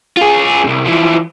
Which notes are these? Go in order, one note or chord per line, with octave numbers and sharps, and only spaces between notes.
F4 G#4
C2 F#2
E3 F3